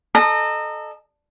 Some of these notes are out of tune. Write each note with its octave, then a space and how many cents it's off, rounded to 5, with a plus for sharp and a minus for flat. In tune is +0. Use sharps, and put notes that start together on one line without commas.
A4 -15 D#5 -30 A#5 -20